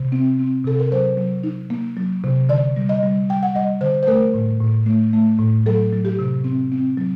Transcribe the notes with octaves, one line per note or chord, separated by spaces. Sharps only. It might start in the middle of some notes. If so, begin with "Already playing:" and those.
Already playing: C3
C4
C4
C3 A4
A#4
F#3 C5
F#3
D#4
A#3
F#3
C3
D3 D5
G3
D#5
G3
G3 G5
F#5
G3 D#5
D3 C5
C5
A3 A#4
A2
A2
A3
A3
A2
F#3 A4
F#3
G4
C3
C4
C4
F#3